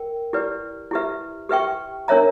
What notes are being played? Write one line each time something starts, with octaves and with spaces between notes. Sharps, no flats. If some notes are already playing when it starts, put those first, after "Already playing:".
Already playing: A#4 G5
E4 G4 B4 D5
E4 G4 B4 E5
G4 B4 E5 G5 C#6
D4 A#4 C#5 E5 A#5